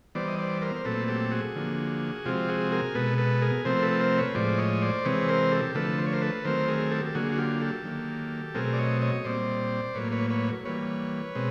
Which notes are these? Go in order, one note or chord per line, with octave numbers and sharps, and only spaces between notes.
E3 G3 B3 C5 D5
D#5
C5 D5
A#4 C5
C5
A#2 F#3 A3 C4 A4 B4
G4 A4
F#4 G#4
D3 F3 A#3
C3 F3 G#3 C4 F4 G4
F#4 G#4
G#4 A#4
B2 G#3 B3 A4 B4
A4 B4
G#4 A#4
C3 F3 A3 C4 A#4 C5
A4 B4
A#4 C5
B4 C#5
A2 F3 G#3 C5 D5
C#5 D#5
C5 D5
C3 E3 G#3 C4 B4 C#5
A#4 C5
G4 A4
D3 F3 A3 A4 B4
C5
C#5
A#4 C5
A4 B4
D#3 F#3 A3 C4 A#4 C5
G#4 A#4
G4 A4
A4
D3 F#3 A#3 F#4 G#4
F#4
F4 G4
G4 A4
D#3 F#3 A#3
B2 F#3 A3 C4 G#4 A#4
D5
C#5 D#5
C#5 D#5
A#2 G3 C4 C5 D5
A2 F#3 A#3 B4 C#5
B4 C#5
B4 C#5
E3 G3 A#3 B4 C#5
B2 G#3 C4